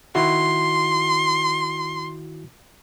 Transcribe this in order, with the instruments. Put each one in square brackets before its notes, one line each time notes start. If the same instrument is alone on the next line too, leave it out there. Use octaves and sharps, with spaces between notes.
[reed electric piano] D#3 E4 F#4 [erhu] C6